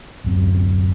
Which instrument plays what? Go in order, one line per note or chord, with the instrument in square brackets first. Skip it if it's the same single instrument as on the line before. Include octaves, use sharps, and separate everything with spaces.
[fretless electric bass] D1 F#2 C4